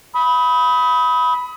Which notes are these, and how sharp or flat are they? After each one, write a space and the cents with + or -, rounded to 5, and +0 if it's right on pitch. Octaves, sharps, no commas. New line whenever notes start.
B5 +0 D#6 +35